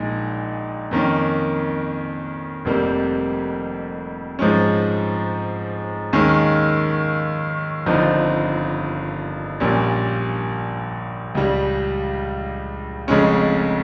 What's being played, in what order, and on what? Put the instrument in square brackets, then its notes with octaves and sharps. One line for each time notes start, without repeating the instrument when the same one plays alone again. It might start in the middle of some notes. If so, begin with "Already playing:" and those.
Already playing: [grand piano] A#1 A#2 G#3 D#4
F2 D#3 A#3 C#4
F1 F2 C3 G3 A#3
G#2 F3 G#3 C#4
D#2 D#3 G#3 C#4
G1 G2 F3 C4 D#4
A#1 A#2 G3 C#4
C#2 C#3 G3
F1 F2 C#3 G#3 C#4